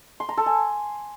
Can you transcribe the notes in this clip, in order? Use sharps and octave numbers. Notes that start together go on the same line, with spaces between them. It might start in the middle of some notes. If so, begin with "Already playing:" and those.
C6
A#5
A4
G#5